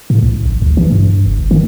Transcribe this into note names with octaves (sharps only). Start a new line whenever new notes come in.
A2
B1
A1
D2
E3
G2
F#1
G1
D#3